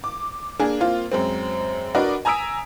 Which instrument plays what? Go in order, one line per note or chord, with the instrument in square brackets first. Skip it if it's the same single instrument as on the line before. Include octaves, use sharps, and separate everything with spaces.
[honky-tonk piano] D6
A#3 D4 G#4 A#4
A#3 C4 F4
F#2 G#3 C4
D4 F#4 A#4 B4 D5 D#5
G#5 A#5 D#6 E6 B6 D7